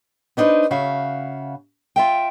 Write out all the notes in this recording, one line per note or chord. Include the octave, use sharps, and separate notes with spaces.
B3 D4 D#4 B4 C5
C#3 F#4 E5 F5
F4 E5 G5